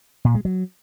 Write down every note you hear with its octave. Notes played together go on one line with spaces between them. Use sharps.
A#2
G#3
F#3